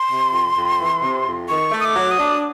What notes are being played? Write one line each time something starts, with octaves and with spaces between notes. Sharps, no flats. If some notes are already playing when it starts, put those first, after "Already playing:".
Already playing: C6
C3
F2
F2
E3
C3
F2
D#3 C#6
A3
D#6
D6
F#3
D#6
D4